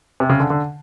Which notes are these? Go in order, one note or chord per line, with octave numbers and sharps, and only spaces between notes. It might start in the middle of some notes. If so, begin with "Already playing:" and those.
C3
C#3
D3
D3